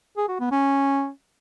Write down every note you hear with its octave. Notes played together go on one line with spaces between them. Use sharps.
G#4
F#4
B3
C#4